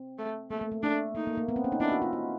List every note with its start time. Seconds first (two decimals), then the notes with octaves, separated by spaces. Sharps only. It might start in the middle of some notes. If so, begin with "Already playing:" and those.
Already playing: C4
0.18 A3
0.50 A3 A#3
0.61 A3
0.72 A3
0.83 A3 D4
1.15 A#3 D#4
1.27 A#3
1.37 A#3
1.49 B3
1.56 C4
1.64 C#4
1.72 D#4
1.80 D4 E4
1.92 F#4
2.02 F4
2.13 F4